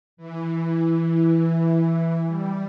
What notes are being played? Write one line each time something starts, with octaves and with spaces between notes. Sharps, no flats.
E3
G3